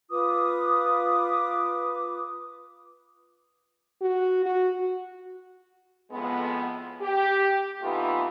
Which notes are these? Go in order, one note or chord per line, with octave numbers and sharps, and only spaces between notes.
F4 B4 D6 D#6
F#4
F#4
F2 A2 G#3 B3
G4
C3 E3 A3 B3 D#4 F4